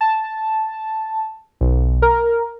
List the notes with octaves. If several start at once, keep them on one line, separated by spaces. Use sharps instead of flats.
A5
B1
A#4